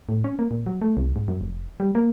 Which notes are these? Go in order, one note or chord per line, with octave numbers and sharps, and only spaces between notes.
A2
C#4
A#3
A#2
F#3
A3
C2
G#2
F#2
F1
G3
A#3